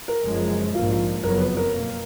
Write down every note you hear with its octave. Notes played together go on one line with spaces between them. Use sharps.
A#4
F#1 F#2 F3 G#3
A#1 G#2 F3 A#3 F4
F4
F#1 F2 C#3 F#3 B3 A#4
B4
A#4
B2 A#3